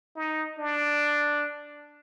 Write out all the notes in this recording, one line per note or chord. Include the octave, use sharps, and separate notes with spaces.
D#4
D4